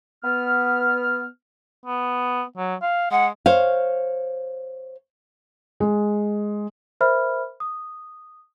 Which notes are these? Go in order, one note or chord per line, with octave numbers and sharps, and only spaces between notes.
B3 F6
B3
F#3
F5
G#3 F#5
C5 C#5 F5
G#3
A#4 C5 E5 B5 F6
D#6